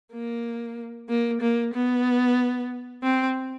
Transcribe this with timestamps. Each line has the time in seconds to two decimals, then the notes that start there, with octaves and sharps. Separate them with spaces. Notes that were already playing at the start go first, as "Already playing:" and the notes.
0.13 A#3
1.09 A#3
1.41 A#3
1.74 B3
3.03 C4